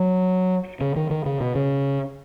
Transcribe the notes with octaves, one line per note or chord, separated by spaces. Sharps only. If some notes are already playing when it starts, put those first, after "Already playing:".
Already playing: F#3
C#3
D#3
D#3
C#3
B2
C#3